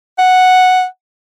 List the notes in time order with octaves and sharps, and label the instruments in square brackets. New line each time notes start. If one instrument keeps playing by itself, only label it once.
[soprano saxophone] F#5